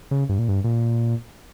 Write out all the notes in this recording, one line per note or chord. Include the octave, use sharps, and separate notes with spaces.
C#3
G2
A#2
G2
A#2